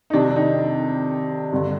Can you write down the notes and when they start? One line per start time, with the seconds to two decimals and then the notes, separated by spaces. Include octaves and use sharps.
0.10 D#4
0.13 F2 C3 D#3 D4
0.36 D#4
1.52 G2 D3